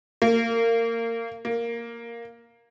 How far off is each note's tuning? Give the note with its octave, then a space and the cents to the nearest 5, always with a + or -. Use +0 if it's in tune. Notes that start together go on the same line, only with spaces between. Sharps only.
A#3 -25
A#3 +0